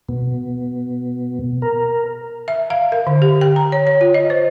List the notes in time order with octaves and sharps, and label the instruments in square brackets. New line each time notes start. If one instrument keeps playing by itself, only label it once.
[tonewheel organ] B2
A#4
[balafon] E5
F5
A#4
D3
G4
G5
A#5
C#5
C#5
F4
D#5
C5